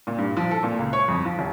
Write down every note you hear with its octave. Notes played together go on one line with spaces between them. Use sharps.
A#2
G2
F3
A4
A#2
C#2
C#5
F2
F3
D#1